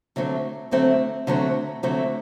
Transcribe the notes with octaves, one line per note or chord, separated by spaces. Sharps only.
D3 F#3 A3 C4
D3 F#3 A3 C4
D3 F#3 A3 C4
D3 F#3 A3 C4